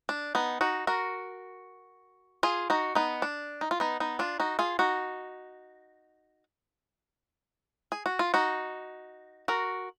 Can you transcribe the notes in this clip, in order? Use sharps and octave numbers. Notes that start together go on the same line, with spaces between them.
D4
B3 D#4
D#4 F#4
F#4 A#4
F4 G#4
D#4 F#4
B3 D#4
D4
D#4
F4
B3 D#4
B3 D#4
D4 F4
D#4 F#4
F4 G#4
D#4 F#4
G#4
F#4
F4
D#4 F#4
F#4 A#4